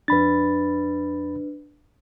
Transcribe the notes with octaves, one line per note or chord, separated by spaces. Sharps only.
F2 D4 B4 B5 A6